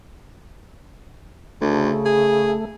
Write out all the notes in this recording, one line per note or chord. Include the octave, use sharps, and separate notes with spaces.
D2 C#3 A3
G#4